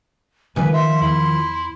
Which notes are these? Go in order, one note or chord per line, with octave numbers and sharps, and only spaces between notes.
D#3 F3 B4 G#5
E5 C6
E2 E4